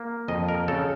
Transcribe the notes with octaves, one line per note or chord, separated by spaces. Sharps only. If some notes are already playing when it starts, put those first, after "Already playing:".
Already playing: A#3
F2 D#5
A#4
C#3 A4